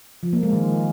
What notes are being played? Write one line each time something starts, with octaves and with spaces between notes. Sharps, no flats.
F3
A#3
G#3
D#3